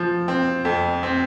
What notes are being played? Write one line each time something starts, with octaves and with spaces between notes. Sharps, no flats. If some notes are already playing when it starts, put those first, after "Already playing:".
Already playing: F3
C4
F2
C4